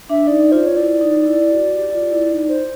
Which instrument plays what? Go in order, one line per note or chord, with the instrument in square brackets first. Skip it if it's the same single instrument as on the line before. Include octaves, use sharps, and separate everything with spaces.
[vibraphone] D4 [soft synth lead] E5
[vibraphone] D#4 [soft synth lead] D5
[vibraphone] F4 [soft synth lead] C5
[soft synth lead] C#5
[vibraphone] E4 [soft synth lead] D5
[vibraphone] D#4
E4
F#4
G4
F4
E4
D#4
[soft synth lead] C5